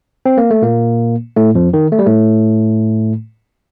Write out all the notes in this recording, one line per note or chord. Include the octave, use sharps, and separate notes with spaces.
C4
A#3
A3
A#2 A#3
A2 A3
F2 F3
D#3
A3
G3
A2 A3